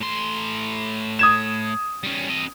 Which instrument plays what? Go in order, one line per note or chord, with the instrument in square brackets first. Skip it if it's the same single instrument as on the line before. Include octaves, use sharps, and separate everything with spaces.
[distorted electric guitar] A2 C6
[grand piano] D#6 G#6 E7
[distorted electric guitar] G3 C#4
C4 D#5